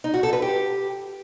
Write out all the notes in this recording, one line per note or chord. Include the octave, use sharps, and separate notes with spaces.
D#4
F#4
A4
B4
G4